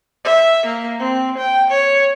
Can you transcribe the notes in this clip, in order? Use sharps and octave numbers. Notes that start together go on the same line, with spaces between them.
E5
A#3
C4
G5
C#5